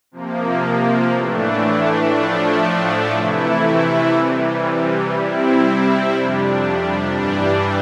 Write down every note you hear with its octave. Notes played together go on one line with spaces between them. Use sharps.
C3 F3 A#3
A2 E3 A3 D4
A2 F3 A3 D4
C3 E3 A3 E4
C3 E3 G3
C3 G3 C4 E4
F2 C3 G3 D4
G2 E3 G3 D4